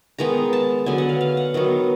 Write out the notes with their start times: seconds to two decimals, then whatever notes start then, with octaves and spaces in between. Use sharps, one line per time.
0.18 D#3 G#3 B3 A#5
0.53 A5
0.86 D3 F#3 B3 G#5
0.98 F#5
1.09 F5
1.21 F5
1.37 F#5
1.54 D#3 F#3 B3